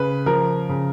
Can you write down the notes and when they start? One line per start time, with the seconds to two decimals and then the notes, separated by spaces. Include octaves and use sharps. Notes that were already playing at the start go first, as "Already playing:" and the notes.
Already playing: C#3 B4
0.26 F3 A#4
0.69 C#3